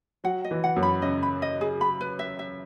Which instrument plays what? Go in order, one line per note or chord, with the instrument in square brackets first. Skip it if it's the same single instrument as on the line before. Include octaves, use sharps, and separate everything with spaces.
[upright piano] F#3 [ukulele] F#5
[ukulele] D#5
[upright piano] E3
[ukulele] F#5
[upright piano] F#2
[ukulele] B5
[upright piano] C#3 [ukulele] D#5
[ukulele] B5
D#5
G#4
B5
B4
E5
E5